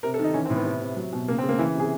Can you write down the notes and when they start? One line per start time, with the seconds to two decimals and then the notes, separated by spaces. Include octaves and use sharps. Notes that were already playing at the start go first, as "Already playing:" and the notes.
0.03 C3 A#4
0.14 A4
0.19 D#3 D#4
0.34 E3 C#4
0.46 C4
0.50 A2
0.56 B3
0.65 C3
0.81 C3
0.96 F#3
1.13 B2
1.28 C#3 A#3
1.38 C4
1.43 C#3
1.49 A#3
1.59 E3 E4
1.75 C3 G#4